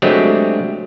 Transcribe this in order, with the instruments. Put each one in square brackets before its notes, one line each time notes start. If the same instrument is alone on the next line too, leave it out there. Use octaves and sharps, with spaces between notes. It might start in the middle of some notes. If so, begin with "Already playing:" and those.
[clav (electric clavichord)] F#3 G#3 A3 C4 D4 G4